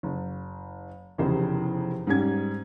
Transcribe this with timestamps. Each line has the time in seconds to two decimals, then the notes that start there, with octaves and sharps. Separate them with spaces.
0.03 F#1
1.18 F1 E2 C#3 G4 C5
2.07 G#2 G3 C#4 G#6